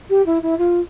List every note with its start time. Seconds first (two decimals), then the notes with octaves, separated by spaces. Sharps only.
0.10 G4
0.26 E4
0.42 E4
0.58 F4